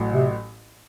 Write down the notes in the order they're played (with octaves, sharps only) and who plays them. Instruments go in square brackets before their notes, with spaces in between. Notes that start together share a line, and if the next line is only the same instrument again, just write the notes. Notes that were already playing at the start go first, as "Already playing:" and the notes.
Already playing: [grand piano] A1 A2 F#3
[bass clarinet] C3